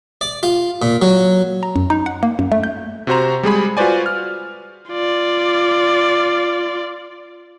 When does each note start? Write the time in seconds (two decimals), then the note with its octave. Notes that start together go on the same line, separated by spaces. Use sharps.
0.21 D5
0.43 F4
0.82 A#2
1.02 F#3
1.63 A#5
1.76 F#2
1.90 D#4
2.06 F#5
2.23 A#3
2.39 F#2
2.52 A3
2.63 G6
3.07 C3 F#4 C5 A#5
3.43 G3 G#3 G#4 B5
3.77 F4 F#4 B4 C5 D5 G#5
4.06 F6
4.91 F4 D5